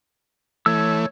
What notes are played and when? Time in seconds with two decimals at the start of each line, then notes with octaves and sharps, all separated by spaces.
0.66 E3 A3 C#5 E6